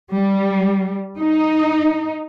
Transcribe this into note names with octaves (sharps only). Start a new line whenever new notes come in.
G3
D#4